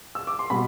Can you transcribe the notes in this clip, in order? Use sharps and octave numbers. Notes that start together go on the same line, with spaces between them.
E6
D6
C6
B2 G3 B5